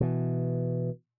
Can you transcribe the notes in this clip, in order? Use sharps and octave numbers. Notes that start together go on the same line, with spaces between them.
B2 E3